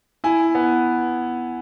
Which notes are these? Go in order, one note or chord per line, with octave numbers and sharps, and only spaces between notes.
E4 G#5
B3